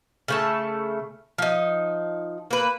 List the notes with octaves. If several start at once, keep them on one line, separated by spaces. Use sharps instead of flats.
C#3 A3 A5
F3 D#4
A#3 B4